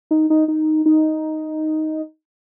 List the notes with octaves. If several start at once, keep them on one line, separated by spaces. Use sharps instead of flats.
D#4
D#4
D#4
D#4